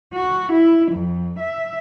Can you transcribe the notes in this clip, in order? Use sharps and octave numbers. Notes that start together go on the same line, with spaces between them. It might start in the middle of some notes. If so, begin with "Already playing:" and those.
F#4
E4
F2
E5